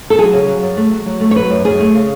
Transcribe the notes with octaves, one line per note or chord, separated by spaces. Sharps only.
A4
F#3 G#4
C#3
F#3
F#2
A3
F#3
F#3
A3
C#5
F#3 B4
F#2
F#2 G#4
A3
C#3